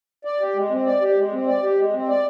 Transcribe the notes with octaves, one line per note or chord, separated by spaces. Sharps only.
D5
G4
G#3
C4
D5
G4
G#3
C4
D5
G4
G#3
C4
D5